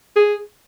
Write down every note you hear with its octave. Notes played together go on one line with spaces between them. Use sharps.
G#4